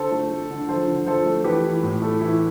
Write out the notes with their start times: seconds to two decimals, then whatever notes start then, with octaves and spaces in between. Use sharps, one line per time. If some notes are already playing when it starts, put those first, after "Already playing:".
Already playing: D3 A4 C5
0.12 A3
0.30 A3
0.50 D3
0.68 F3 A4 C5
0.87 D3
1.07 F3 A4 C5
1.26 A3
1.44 E3 G4 B4
1.64 E3
1.83 A2
2.02 A3
2.20 E3 E4